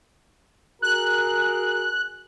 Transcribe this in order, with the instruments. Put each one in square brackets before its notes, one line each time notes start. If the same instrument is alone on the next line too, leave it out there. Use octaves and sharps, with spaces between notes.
[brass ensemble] F#4 G#4 A#4 [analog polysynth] F#6